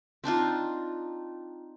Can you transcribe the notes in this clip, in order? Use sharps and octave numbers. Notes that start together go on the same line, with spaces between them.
C4 D4 D#4 F4